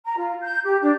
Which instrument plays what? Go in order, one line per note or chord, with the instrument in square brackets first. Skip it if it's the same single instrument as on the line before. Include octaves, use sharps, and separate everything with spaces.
[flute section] A#5
F4
G6
G4
D4